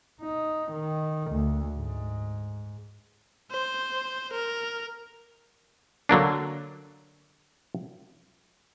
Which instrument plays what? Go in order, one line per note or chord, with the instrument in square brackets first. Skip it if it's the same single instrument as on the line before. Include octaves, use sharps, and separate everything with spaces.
[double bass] D#4
D#3
D2
G#2
[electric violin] C5
A#4
[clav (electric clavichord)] D3 F#3 A#3 D4